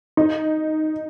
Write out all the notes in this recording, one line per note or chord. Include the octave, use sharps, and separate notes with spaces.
D#4